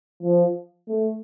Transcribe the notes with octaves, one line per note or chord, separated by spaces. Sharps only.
F3
A3